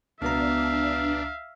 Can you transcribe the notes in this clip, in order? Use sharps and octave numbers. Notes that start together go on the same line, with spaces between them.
C#2 B2 B3 D4 E5 F5 A#5